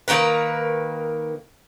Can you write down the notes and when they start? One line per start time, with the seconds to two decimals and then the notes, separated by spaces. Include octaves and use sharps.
0.08 D#3 A#3 A#4 B4